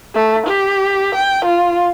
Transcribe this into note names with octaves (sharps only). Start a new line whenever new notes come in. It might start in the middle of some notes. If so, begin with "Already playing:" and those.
A3
G4
G5
F4